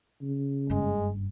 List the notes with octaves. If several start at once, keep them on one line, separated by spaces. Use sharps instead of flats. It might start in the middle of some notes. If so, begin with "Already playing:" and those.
C#3
F#1 G2 G#3